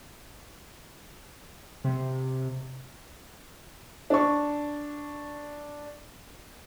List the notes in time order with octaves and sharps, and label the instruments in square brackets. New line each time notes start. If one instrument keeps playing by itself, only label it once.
[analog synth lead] C3
[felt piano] D4 C#6